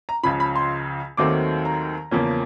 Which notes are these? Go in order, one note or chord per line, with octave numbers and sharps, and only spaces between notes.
A#5
C#2 C#3 F3 B5
B5
C6
D#2 D#3 F#3 A3 C4 D6
A#5
E2 C#3 F3 A#3 C#4